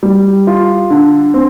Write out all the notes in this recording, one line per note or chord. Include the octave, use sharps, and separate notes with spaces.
G3
F4
D3
C4